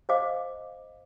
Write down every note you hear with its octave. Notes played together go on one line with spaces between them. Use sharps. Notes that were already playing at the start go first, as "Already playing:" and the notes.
C5 D#5 F5 D6